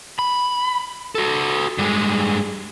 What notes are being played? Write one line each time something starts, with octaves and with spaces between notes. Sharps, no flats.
B5
F#4 A4
G2 G#3